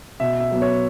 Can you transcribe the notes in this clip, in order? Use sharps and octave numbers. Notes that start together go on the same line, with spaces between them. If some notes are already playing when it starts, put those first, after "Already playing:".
B2 E5
E5
F#3 B3
C#5